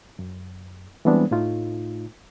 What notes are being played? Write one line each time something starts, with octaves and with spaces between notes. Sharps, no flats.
F#2
E3 G3 G#3 B3 C4 D4
A2 A3 D#4 F4